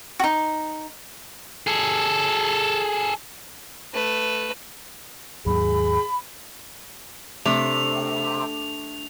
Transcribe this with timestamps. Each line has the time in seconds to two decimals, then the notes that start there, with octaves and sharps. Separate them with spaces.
0.20 D#4 F#4
1.67 G#4 A4
3.93 A3 B4
5.46 D#2 G#2 F#3 G#4 B5
7.46 C3 A3 D4 F7